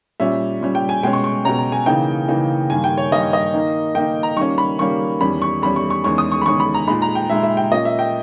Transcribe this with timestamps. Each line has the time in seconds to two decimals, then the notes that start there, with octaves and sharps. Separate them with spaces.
0.20 A#2 G3 C#4 E5
0.61 A#2 G3 C#4
0.75 G5
0.89 G#5
1.03 B2 G#3 C#4 G5
1.13 C#6
1.24 C#6
1.45 B2 G#3 C#4 A#5
1.59 A#5
1.72 G#5
1.86 C#3 E3 A#3 D#4 G5
2.28 C#3 E3 A#3 D#4
2.70 G2 D#3 A#3 G#5
2.84 G5
2.98 C#5
3.12 G2 D#3 A#3 D#5
3.33 D#5
3.54 D#3 A#3 D#4
3.95 D#3 A#3 D#4 G5
4.23 A#5
4.37 D#3 G3 A#3 C#4 C#6
4.58 B5
4.78 D#3 G3 A#3 C#4 C#6
5.21 E2 D#3 G3 C#4 B5
5.42 C#6
5.62 E2 D#3 G3 C#4 B5
5.76 C#6
5.90 C#6
6.04 E2 D#3 G#3 C#4 C#6
6.18 D#6
6.32 C#6
6.42 B5
6.46 E2 D#3 G#3 C#4 C#6
6.60 B5
6.74 A#5
6.88 A#2 G#3 D#4 B5
7.02 A#5
7.15 G5
7.30 A#2 G#3 D#4 E5
7.43 E5
7.57 G5
7.71 A#2 A#3 C#4 D#5
7.85 E5
7.99 G5